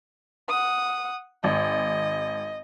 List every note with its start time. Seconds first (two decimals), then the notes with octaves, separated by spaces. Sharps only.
0.49 F#5 D#6
1.44 G#1 D#5